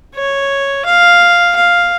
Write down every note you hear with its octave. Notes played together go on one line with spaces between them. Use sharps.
C#5
F5
F5